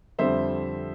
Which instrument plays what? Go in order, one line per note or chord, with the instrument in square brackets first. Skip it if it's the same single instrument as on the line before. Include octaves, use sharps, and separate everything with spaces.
[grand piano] F2 D3 G3 C4 C5 E5